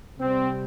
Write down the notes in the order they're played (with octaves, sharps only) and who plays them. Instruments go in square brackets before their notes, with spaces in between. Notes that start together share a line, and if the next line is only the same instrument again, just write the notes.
[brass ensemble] C3 G3 C4